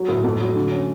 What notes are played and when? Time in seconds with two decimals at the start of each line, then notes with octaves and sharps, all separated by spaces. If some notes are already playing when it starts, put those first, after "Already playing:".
Already playing: F#3
0.08 A2
0.24 F2
0.40 F#3
0.55 D3
0.71 C#4